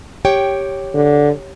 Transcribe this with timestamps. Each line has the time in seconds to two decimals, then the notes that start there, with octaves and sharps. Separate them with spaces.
0.25 G4 C#5 G5
0.94 D3